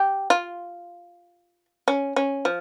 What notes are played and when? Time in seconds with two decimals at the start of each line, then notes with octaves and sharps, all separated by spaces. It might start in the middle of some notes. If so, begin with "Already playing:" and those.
Already playing: G4
0.30 F4
1.88 C#4
2.16 C#4
2.45 F3